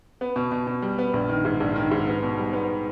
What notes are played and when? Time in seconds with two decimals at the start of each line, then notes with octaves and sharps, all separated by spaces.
0.21 B3
0.36 B2
0.52 B2
0.67 B2
0.82 G3
0.98 B3
1.13 A#1
1.29 D#3
1.45 G#2
1.60 A#1
1.76 D#3
1.91 G#2
2.07 B3
2.23 B2
2.38 G3
2.53 B3